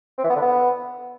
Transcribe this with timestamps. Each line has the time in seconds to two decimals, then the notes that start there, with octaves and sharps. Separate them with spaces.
0.18 C4
0.24 E3
0.30 B3
0.36 D3
0.42 B3